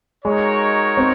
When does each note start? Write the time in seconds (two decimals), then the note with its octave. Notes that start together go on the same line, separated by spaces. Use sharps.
0.25 G#3 D#4 F#4 A#4 C#5
0.97 C4